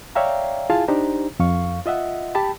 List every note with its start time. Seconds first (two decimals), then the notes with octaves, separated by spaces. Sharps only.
0.15 C#5 D5 E5 F5 G5 A#5
0.70 E4 F4 G#4 F5 G#5 A5
0.88 D4 D#4 G4 C5 A#5
1.40 F2 F5 C#6
1.86 F4 D#5 E5 F#5
2.35 G4 G5 A5 B5